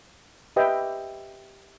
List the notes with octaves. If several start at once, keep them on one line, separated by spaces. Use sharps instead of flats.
G4 B4 D#5 E5 G5